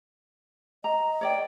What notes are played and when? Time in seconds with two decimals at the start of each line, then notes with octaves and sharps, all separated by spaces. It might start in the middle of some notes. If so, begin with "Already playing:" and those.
0.84 D#5 A#5
1.21 C#5 D5 G5